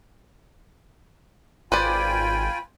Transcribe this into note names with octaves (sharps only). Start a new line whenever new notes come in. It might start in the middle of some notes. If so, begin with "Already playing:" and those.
G#1 F4 B4 C5 D5 G5 G#5 B5